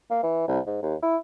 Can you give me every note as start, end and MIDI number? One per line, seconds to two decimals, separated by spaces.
0.11 0.21 58
0.23 0.47 52
0.48 0.59 36
0.67 0.82 44
0.83 0.95 39
1.03 1.17 64